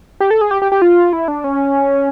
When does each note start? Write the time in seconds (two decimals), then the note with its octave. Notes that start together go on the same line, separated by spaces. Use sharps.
0.20 G4
0.31 A4
0.41 G#4
0.51 G4
0.62 G4
0.72 G4
0.82 F4
1.13 E4
1.28 D4
1.44 C#4